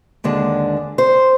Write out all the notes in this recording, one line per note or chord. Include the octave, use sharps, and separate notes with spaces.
D#2 D3 G#3 D4
C5